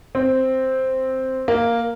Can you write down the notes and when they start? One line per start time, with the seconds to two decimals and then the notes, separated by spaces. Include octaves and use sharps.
0.15 C4
1.48 A#3